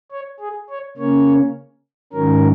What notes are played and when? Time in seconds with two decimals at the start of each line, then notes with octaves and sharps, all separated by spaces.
0.11 C#5
0.40 G#4
0.70 C#5
0.97 C#3 A#3 C#4 C#5
2.13 G#2 D#3 F#3 C#4 A#4